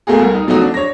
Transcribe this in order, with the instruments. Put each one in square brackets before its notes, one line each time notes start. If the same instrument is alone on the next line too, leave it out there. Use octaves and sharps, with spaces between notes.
[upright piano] A3 A#3 F#4 G#4
C2 A#4
D#4
F3 F#3 A3 D#4 F#4
D4
C#5 A#6